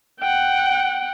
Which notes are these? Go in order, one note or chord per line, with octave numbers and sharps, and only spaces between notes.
F#5 G5